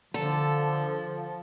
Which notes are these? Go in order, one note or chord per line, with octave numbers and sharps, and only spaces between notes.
D3 F3 A4